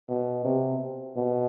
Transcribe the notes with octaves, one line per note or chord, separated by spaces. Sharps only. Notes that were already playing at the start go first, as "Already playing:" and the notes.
B2
C3
B2